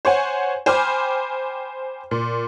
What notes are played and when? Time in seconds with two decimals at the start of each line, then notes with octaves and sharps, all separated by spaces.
0.05 C5 C#5 F#5 G#5
0.66 C5 G5 G#5 B5 D6 F6
2.11 A#2